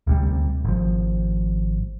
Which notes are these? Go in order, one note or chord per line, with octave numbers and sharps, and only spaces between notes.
D2 C3 G3
G#1 F3